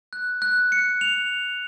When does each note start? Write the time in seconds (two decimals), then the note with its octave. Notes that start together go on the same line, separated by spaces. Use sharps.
0.13 F#6
0.42 F#6
0.72 C#7
1.01 F7